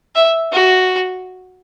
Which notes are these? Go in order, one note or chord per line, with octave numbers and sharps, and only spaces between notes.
E5
F#4